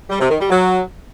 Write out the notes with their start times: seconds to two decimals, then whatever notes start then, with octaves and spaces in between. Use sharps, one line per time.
0.10 G3
0.20 C3
0.30 D#3
0.40 G3
0.50 F#3